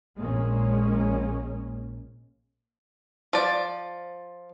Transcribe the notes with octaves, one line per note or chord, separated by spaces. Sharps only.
A#1 A#2 G#3 A#3 C#4
F3 D5